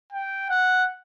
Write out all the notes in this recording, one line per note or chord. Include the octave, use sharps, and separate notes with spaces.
G5
F#5